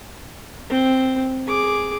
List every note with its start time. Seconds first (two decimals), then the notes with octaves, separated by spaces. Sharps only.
0.69 C4
1.47 G#4 D6